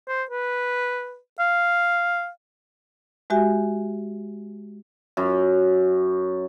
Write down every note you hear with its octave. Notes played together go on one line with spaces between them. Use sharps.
C5
B4
F5
G#3 F#4 G4 E5 G#5
F#2